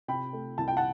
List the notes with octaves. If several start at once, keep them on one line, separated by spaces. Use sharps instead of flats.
C3 G5 B5
A3
C2 A5
G5
F#5 A5